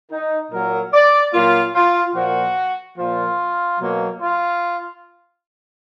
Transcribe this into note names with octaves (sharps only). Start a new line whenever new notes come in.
D#4
A#2 F#3 A#3 A#4
D5
A#2 F#3 A#3 F4
F4
A#2 F3 A#3 F#4
A#2 F3 A#3 F4
B2 F#3 A#3
F4